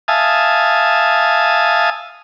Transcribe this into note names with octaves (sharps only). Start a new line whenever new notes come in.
E5 F5 G#5 A5 D#6